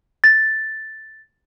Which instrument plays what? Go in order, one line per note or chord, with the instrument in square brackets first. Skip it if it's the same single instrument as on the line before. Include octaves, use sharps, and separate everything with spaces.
[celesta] A6